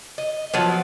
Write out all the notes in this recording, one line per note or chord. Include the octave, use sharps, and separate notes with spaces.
D#5
F3 F#3 B3